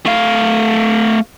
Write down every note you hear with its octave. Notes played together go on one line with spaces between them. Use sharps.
A3 F5